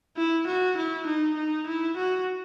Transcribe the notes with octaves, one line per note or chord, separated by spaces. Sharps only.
E4
F#4
E4
D#4
D#4
E4
F#4